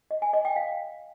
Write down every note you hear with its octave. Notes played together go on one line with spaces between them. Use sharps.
D#5
G#5
D#5
G5
F5